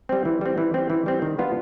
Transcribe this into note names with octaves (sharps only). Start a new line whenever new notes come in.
G3 C4
E3
G3 C4
E3
G3 C4
E3
G3 C4
D#3
G3 B3 D4 F4